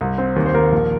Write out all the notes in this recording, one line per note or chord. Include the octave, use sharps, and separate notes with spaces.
C2
C4
D#2
C5
D#2 A#4
A#1